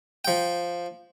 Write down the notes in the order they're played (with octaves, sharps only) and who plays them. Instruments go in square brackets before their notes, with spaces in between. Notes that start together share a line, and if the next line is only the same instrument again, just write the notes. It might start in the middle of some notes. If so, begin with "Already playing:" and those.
[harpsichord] F3 G5